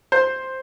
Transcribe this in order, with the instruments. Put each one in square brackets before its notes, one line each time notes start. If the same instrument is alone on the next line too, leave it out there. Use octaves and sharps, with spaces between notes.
[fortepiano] C5